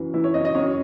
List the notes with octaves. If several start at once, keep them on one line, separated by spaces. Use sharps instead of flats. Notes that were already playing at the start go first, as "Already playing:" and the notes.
Already playing: F#2 E3
E3 E4
C#5
F#2 D#5
D#5
F#2 C#5